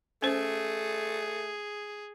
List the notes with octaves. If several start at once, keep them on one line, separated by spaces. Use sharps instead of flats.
A3 C#4 G#4 C5